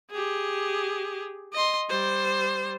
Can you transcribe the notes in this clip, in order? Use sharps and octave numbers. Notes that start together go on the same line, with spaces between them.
G4 G#4
D#5 C6
G3 C5